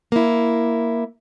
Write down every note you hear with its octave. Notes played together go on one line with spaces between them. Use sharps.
A#3 E4